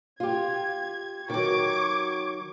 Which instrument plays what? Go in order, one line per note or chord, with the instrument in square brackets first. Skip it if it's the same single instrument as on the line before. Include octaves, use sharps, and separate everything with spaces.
[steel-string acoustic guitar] F4 G4 [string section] G#6
[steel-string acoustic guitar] D#3 F#3 [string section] C#6 D6 G#6